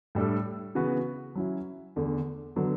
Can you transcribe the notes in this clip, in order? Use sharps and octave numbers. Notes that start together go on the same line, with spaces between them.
A2 G3 D4 A4
C#3 E3 B3 F#4 B4
F#3 C#4 E4
E2 D3 A3
D3 F#3 B3